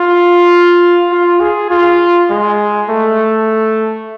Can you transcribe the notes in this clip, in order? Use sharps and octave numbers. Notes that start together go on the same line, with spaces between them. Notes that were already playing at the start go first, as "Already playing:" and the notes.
Already playing: F4
F4
G#4
F4
G#3
A3